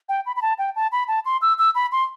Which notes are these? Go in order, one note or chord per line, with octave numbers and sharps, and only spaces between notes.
G5
B5
B5
A5
G5
A5
B5
A5
C6
E6
E6
B5
C6